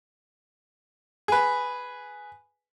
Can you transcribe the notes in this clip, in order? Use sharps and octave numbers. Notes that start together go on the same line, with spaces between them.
G#4 B4